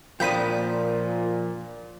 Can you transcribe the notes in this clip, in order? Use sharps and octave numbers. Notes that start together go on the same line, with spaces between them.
A#2 F3 A#3 D4 G5 B5 D#6